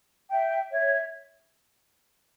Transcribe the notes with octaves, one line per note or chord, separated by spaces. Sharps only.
E5 G5
C#5 E5